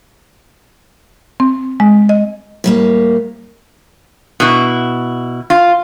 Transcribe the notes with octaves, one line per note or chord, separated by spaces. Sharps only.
C4
G#3
D#5
A2 G3 A#3
B2 E4
F4